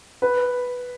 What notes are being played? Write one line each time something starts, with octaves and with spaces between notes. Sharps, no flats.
B4